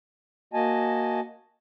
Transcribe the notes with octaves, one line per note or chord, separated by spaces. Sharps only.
A#3 F#4 D#5 G#5 A5